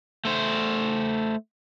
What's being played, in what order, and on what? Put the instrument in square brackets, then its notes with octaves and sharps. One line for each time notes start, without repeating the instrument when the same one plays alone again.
[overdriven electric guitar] A3 C5